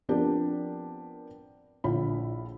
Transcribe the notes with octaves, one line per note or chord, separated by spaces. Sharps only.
F3 B3 C4 D4 G4 A#4
A#1 D3 E4 F4 C#5 B5